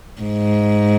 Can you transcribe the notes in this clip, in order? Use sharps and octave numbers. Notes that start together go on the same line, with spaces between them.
G#2